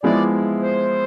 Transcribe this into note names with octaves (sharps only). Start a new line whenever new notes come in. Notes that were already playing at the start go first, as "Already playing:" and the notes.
F3 G#3 B3 E4 G#4 D5
C5